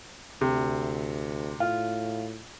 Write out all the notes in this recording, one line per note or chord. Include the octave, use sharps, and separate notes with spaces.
D2 C3
A2 F4